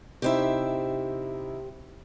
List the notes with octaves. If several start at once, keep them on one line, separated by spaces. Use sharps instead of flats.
C3 D#4 E4 G4 C5 E5